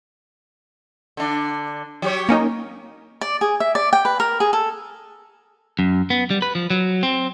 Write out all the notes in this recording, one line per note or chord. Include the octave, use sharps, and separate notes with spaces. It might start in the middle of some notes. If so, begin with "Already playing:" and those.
D3 D4
F#3 G4 C#5
A#3 C#4 D#4
D5
G#4
E5
D5
G5
B4
A#4
G#4
A4
F#2
B3
G3
B4
F3
F#3
C4